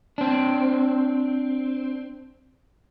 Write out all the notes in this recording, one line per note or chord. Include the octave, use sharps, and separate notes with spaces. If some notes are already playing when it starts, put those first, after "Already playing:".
C4 D4